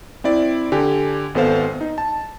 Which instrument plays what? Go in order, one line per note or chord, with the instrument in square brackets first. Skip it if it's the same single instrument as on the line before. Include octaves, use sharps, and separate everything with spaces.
[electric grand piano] C4 E4 D5
D3 G4 G#5
G#1 B3 A4 C5 F5
D#4
A5